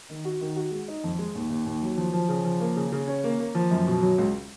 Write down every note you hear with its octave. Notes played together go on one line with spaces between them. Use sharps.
D#3
F#4
D#3
F#4
G#3
D#4
F2
G#3
D#2
D#2
D#2
F#3
F3
F3
C#3
F3
A#3
C#3
C#3
C#4
A#3
A#3
F3
F#2
B2
F#3
C#2